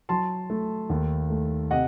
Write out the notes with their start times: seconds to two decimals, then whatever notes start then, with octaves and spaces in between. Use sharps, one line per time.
0.09 F#3 A5 C6
0.50 A3
0.90 D#2
1.30 A3
1.71 C3 D#5 F#5